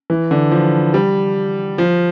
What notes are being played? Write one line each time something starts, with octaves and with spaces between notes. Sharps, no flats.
E3
D3
F3
G3
F3